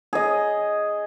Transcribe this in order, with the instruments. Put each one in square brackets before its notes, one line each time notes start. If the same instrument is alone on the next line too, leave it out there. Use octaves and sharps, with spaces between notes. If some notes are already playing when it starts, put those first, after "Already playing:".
[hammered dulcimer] G#4 D#5